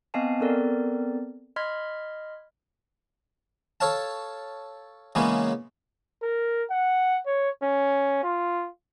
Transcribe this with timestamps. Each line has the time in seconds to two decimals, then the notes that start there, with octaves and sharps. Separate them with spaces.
0.14 B3 C4 D#5 F5 G#5 A5
0.40 B3 C4 A4 A#4 D5
1.56 D#5 B5 C6 F6 G#6 B6
3.80 A4 C#5 F5 A5
5.15 C#3 E3 G#3 A#3 B3 C#4
6.23 A#4
6.70 F#5
7.26 C#5
7.63 C#4
8.23 F4